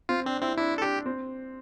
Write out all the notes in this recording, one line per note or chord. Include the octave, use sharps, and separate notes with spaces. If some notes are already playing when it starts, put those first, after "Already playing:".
C4 F4
C4 D4
C4 E4
D4 E4
A4
D4 G4
C4